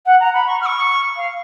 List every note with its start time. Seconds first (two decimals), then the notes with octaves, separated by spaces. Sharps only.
0.06 F#5
0.20 A#5
0.34 B5
0.47 C#6
0.61 F6
0.66 C#6
1.16 F5